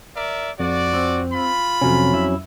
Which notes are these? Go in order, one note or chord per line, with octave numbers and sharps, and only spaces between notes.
A#4 D5 E5
F2 F#4 D5
C4
F4 B5
F2 C3 F#3 C#4
E4